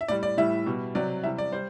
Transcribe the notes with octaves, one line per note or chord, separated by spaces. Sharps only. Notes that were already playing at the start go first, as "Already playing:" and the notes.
E5
A2 G3 D5
D5
A2 E3 G3 E5
B2 G3
C3 F#3 D5
C3 E3 G3 E5
D5
G3 C5